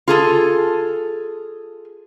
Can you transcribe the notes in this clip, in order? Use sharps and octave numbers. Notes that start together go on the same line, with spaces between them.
F4 G#4 A4 A5